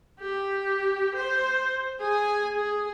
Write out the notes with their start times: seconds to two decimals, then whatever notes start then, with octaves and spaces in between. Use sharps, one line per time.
0.20 G4
1.15 C5
2.00 G#4 G#5
2.56 G#4